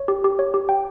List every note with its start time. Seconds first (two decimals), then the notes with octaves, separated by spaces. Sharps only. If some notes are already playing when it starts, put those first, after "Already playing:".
Already playing: C#5
0.08 G4
0.24 G4
0.39 C#5
0.54 G4
0.69 G5